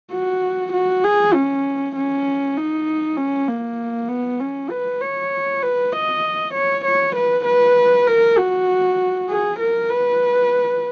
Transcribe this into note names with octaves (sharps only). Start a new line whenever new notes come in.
F#4
F#4
G#4
C#4
C#4
D#4
C#4
A#3
B3
C#4
B4
C#5
B4
D#5
C#5
C#5
B4
B4
A#4
F#4
G#4
A#4
B4